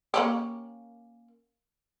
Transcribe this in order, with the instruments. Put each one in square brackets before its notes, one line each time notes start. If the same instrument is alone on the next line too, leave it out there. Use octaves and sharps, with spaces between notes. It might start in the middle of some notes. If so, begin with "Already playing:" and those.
[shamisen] A#3 C#4 G4